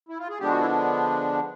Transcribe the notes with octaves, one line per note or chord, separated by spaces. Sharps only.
E4
F4
G#4
D3 F3 G#3 B3 D4 G4
F#4
E4